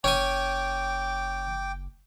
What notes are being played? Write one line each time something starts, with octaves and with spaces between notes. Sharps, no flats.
F#1 C#4 G5 G#5 D6